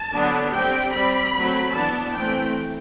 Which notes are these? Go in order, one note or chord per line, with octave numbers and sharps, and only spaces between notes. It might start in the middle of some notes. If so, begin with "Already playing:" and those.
Already playing: A5
D3 F#3 B3 D4
G3 C4 G5
G3 C4 B5
F#3 A3 C4
E3 B3 D4 A5
E3 A3 C4 G5